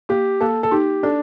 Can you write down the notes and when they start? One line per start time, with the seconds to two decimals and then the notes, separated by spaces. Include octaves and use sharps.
0.09 A#3 G4
0.41 A#3 A4
0.63 A4
0.71 D#4 G4
1.03 D4 A4